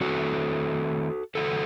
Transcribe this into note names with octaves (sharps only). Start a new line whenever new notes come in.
D#3 A3 C4 F#4 A4
D#3 F#3 A3 F#4 A4